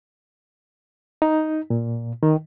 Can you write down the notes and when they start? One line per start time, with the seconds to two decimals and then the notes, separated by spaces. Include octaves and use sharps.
1.22 D#4
1.70 A#2
2.23 D#3